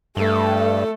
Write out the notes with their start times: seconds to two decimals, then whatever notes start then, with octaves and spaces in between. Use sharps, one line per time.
0.17 G2 A3 A4